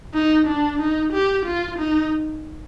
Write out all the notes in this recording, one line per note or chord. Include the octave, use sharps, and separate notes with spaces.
D#4
D4
D#4
G4
F4
D#4